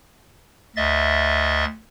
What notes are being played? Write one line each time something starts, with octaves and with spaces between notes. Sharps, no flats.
D2 D#5 E5 A6